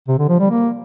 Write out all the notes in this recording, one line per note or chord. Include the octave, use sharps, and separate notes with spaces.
C3
D3
F3
G3
A#3